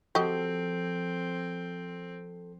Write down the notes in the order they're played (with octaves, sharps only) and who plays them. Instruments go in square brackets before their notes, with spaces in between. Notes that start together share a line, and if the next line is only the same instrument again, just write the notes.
[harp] F3 [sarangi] C4 [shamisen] F#4 G4 D#5 [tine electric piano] A4